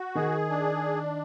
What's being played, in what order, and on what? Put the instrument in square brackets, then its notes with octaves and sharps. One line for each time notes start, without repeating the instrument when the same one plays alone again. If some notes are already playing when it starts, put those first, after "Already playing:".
Already playing: [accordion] F#4
[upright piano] D#3 [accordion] G#4
[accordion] D4